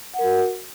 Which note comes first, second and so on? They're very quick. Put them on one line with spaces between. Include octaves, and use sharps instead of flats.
F#5 A#4 F#4